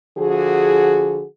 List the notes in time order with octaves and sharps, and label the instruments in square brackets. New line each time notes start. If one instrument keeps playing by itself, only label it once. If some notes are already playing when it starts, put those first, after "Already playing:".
[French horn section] D3 F3 F#4 G#4